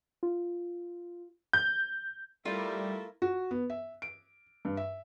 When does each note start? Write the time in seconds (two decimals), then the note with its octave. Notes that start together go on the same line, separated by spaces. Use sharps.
0.23 F4
1.53 G6
2.45 G3 A3 E4 F4 A#4 D5
3.22 F#4
3.51 B3
3.70 E5
4.02 D7
4.65 G2
4.77 E5